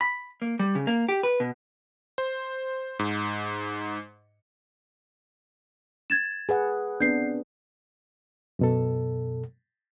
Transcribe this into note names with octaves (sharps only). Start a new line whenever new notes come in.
B5
A#3
G3
C#3
A#3
G4
B4
B2
C5
G#2
G#6 A6 E7
G#4 B4 F#5
B3 C4 D4 G6 C7
F#2 B2 A4